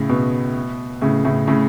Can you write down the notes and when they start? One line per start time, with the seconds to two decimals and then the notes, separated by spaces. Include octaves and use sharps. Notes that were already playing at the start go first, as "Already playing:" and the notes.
Already playing: A2 C#3
0.09 B2
1.02 A2 C#3
1.25 A2 C#3
1.47 A2 C#3